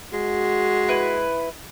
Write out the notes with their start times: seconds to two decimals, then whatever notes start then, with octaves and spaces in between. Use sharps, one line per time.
0.13 G#3 F#4
0.89 E4 B4